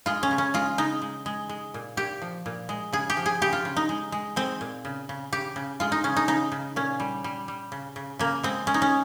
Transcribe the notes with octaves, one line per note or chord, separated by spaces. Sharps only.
G#3 F4
C#4
C#3
C#4
G#3 F4
C#3 D#4
G#3
G#3
G#3
A#2
A#2 G4
F3
A#2
G#3
C#3 G#4
G4
F3
G#4
C#3 G4
F4
C#3
D#4
G#3
G#3
G#3 C4
A#2
C#3
C#3
C#3 G4
C#3
G#3 F4
D#4
C#3 C#4
D#4
C#3 D#4
C#3
A#2 C#4
G3
G3
G3
C#3
C#3
C#3 A#3
G#3 C4
G#3 C#4
D#4
C#4